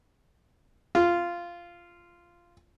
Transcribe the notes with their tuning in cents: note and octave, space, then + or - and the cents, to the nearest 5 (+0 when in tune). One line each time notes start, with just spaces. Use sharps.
F4 -10